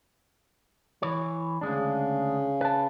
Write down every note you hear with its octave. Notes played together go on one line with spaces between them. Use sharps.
E3 C#5
D2 C#3 G#3 D4
B4 A5